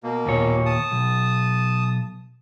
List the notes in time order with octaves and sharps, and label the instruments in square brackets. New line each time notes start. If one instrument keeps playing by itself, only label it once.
[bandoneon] B2 A#3
[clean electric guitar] D#2 A#2 C#5
[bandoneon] A5 D#6
[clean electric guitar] B1